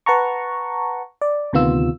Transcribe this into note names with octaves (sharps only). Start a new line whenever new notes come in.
B4 F#5 A5 A#5 C#6
D5
D2 C3 D#3 B3 F4 E6